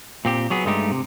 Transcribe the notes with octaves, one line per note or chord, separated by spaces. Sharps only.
A#2 C4 G4
F#3 B3 G#4
G2 G#3 A3 D#4 G4
C3